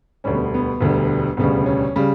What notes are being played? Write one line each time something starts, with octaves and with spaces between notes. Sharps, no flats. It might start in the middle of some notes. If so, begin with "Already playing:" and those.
E1 D2 D3 G3 C#4
B3
B3
E1 D2 D3 G3
E1 D2 C#3 G3 B3
C#4
C#3 G3